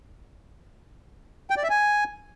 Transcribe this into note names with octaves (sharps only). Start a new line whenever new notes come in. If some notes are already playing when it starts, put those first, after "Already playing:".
G5
D5
E5
G#5